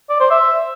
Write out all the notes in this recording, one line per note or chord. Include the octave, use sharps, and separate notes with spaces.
D5
C5
E5